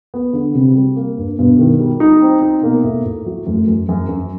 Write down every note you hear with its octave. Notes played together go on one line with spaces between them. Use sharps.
B3
D3
C3 G3
G3
A#3
G2
G2 B2
D#3
G3
D#4
C4
D#4
B2 A#3
A2
A2
F#3
F#2 A2
F#2
F#2
F#2